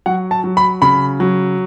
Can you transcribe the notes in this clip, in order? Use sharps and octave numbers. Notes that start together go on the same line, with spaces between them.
F#3 F#5
A5
F#3
B5
C#3 B5
F#3